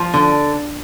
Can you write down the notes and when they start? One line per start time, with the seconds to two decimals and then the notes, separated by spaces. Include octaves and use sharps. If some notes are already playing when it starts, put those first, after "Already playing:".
Already playing: F3
0.14 D3